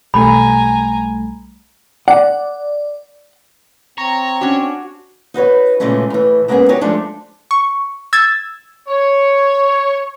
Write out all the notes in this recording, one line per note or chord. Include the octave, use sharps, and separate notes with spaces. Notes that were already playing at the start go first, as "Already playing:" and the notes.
B1 G3 A3 G#5 A#5 B5
D5 F#5
C4 C#5 A#5
C#4 D4 F#4
D#4 F#4 B4 C#5
A#2 C#3 E3 G#3 A3 C#4
A2 E3
G#3 A#3 B3 C#4 G4 G#4
D#4 F#4 G4 C#5
F3 G#3 A3 D4 A4
C#6
E6 G#6 A6
C#5